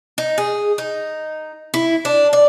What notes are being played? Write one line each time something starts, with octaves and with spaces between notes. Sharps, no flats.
D#4
G#4
D#4
E4
D4
D5